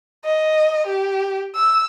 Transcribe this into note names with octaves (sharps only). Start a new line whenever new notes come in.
D#5
G4
E6